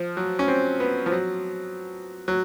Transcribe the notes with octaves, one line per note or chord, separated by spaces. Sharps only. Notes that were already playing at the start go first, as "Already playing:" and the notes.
Already playing: F3
F#3
C#4
C4
B3
F3
F#3
F#3